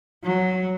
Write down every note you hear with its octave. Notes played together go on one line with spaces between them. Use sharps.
F#3